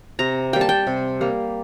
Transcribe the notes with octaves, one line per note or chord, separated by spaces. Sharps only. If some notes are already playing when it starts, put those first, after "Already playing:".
C3 A#5
G3 A#3 G5
A5
G5
C3
G3 A#3